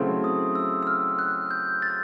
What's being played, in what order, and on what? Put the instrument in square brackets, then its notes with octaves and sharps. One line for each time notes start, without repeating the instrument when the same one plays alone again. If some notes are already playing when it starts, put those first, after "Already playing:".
Already playing: [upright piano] C#3 F#3 A3 C4 E4
[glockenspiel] D#6
E6
E6
F6
F#6
G6
A6